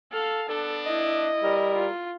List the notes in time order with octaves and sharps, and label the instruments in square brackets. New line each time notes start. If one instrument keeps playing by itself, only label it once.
[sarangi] A4 [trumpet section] F5
[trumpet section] B3 D4 [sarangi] A4
[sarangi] E4 [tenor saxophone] D#5
[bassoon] G3 [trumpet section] E4 A#4
[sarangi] F4